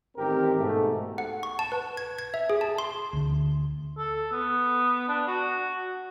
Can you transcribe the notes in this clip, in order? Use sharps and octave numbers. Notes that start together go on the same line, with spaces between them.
A1 D#3 C4 G4 A#4
G#2 B2 A3
F#5
C#6
A5
B4
G#6
G#6
E5
G#4
A5
C6
D2 D3
A4
B3
D4
F#4